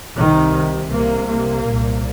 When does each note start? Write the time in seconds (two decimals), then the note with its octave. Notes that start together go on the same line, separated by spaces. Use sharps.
0.16 C2 C3 D#3
0.91 C2 C3 A#3
1.29 A#3
1.66 C2 A#2